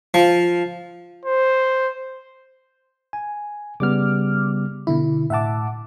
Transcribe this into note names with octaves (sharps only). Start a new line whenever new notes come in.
F3
C5
G#5
C#3 G3 B3 D6 F6
B2 D3 E4 B5
A2 E5 F#5 A5 D6